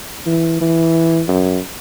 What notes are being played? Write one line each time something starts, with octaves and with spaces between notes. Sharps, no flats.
E3
E3
F#2